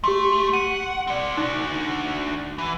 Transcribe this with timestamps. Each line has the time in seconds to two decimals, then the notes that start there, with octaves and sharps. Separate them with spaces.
0.04 A3 G4 C6
0.54 F#5 D#7
1.07 C4 D5
1.37 D4 D#4 F#4
2.58 E3